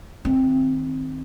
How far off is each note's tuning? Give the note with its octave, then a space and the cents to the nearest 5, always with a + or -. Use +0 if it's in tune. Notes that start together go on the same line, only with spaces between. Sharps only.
D#3 +0 C4 +0